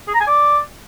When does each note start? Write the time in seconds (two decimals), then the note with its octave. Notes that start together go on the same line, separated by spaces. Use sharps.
0.07 G#4
0.14 A#5
0.21 G#5
0.27 D5